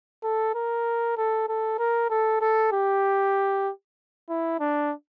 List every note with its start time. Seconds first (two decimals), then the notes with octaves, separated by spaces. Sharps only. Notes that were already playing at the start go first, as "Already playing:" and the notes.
0.24 A4
0.55 A#4
1.17 A4
1.49 A4
1.79 A#4
2.10 A4
2.41 A4
2.73 G4
4.29 E4
4.60 D4